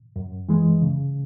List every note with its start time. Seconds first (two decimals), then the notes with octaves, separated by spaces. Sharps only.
0.16 F#2
0.49 E3 G#3
0.82 C#3